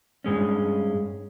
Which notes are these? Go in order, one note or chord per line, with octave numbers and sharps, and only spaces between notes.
G2 G#3 C#4